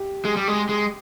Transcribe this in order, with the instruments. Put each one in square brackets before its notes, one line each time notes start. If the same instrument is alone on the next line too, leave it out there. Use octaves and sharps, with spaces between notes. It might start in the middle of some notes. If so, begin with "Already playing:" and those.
Already playing: [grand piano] G4
[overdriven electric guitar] G#3
G3
G#3
G#3